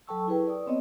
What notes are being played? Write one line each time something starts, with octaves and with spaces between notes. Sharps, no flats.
F#3 A4 G5 A5 C#6 E6
E4 G#4 B4 G5
D5 D#6
B3 C4 C#5 D#5